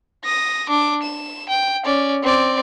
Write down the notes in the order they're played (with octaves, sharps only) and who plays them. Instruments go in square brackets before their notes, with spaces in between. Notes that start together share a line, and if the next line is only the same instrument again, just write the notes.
[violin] D#6 A#6
D4 D6
E7
G5
C#4 D5
C4 D5